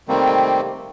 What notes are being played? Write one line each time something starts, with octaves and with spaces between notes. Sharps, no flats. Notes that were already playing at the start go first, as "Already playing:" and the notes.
C3 D#3 G3 A3 A#3 C4